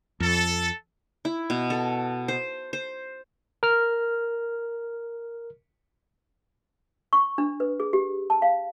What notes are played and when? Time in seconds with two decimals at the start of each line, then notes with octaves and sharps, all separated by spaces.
0.20 F2 A4
1.25 E4
1.50 B2
1.70 A4
2.28 C5
2.73 C5
3.63 A#4 F6
7.13 C#6
7.38 D4
7.60 B4
7.80 G#4
7.93 G4
8.30 A5
8.42 F5